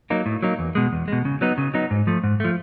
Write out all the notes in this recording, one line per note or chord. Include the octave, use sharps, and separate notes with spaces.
F#3 A#3 D#4
A2
F#3 A#3 D#4
E2
B2 G#3
E2
B2 G#3
C#3
F#3 B3 D#4
C#3
F#3 B3 D#4
G#2
F3 A3
G#2
F3 A3